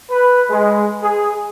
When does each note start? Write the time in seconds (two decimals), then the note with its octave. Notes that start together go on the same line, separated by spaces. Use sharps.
0.10 B4
0.50 G#3
1.03 G#4